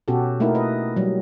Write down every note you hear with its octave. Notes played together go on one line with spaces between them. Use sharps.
B2 C#4 F#4 G4 A4
A3 A#3 D#4 E4 A#4
B4 D#5
F#3 G3